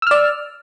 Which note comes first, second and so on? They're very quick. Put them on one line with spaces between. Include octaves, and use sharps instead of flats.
E6 F6 D5